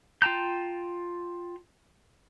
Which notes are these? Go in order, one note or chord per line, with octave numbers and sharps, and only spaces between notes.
F4 G5 A5 A#5 G6